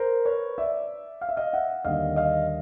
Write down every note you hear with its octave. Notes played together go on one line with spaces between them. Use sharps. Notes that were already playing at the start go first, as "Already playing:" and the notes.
Already playing: A#4 C5
B4 C#5
D5 E5
F5
E5
D#5 F5
E5 F#5
D#2 D3 G3 A#3 D#5 F5
D#5 F5